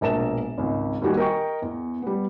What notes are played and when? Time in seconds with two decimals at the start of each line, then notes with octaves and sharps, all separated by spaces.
0.01 E1 A#1 A#4 A5 E7
0.58 G#1 C#2
1.02 D#2 D#3 G3 F#4 G4 G#5
1.17 A#4 D#5 G5 C#6
1.62 E2
2.02 G3 B3